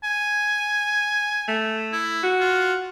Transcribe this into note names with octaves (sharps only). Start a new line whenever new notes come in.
G#5
A3
E4
F#4
F4